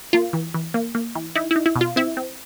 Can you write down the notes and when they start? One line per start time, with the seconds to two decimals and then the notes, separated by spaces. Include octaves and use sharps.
0.13 A#3 F4
0.33 E3
0.54 E3
0.74 A#3
0.95 A#3
1.15 E3
1.36 D#4 E4
1.51 E4
1.56 D#4
1.66 E4
1.76 B2
1.81 F4
1.96 C4 E4
2.17 C4